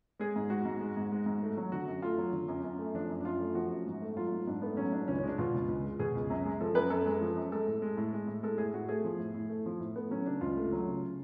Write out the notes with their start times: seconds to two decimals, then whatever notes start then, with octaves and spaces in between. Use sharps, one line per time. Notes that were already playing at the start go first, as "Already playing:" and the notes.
0.20 G#3 G#4
0.36 G#2
0.50 G#3 F#4
0.65 G#2
0.81 G#3
0.97 G#2
1.12 G#3
1.26 G#2
1.43 A3
1.57 F#3
1.72 D3 F#4
1.87 F#2
2.02 A3 F4
2.18 F#3
2.33 D3
2.48 F#2
2.64 F#2
2.79 A3
2.95 F3 D4
3.09 F#2
3.21 D4
3.25 F#2 F4
3.40 A3
3.55 F3 F#4
3.71 F#2
3.87 G#2
4.02 A3
4.17 F#3 F4
4.32 G#2
4.47 G#2 D4
4.62 A3 B3
4.77 F#3 C#4
4.92 G#2 D4
5.08 C#2 C#4
5.19 C#4
5.23 G#3 D4
5.38 B2 F4
5.54 C#2
5.68 C#2
5.84 G#3
6.00 B2 G#4
6.15 C#2
6.30 F#2
6.45 G#3
6.61 F3 A4
6.75 F#2 B4
6.90 F#2 A4
7.06 G#3
7.21 F3
7.37 F#2
7.52 G#3 A4
7.67 A2
7.82 G#3
7.97 A2
8.13 G#3
8.27 A2
8.43 G#3 A4
8.58 A2 G#4
8.74 A2 F#4
8.89 A3 G#4
9.05 F3
9.19 A2
9.34 A2
9.49 A3
9.66 F3
9.80 A2
9.96 A3 B3
10.11 F#3 C#4
10.26 C#3 D4
10.41 C#2 F4
10.57 A3
10.72 F#3
10.87 C#3